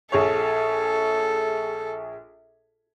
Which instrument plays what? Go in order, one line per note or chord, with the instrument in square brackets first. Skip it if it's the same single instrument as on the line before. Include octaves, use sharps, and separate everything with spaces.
[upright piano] A#1 G#4 C#5 [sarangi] A4